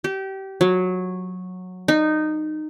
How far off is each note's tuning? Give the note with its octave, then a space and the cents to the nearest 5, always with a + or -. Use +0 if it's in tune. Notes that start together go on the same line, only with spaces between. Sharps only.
G4 -25
F#3 -15
D#4 -15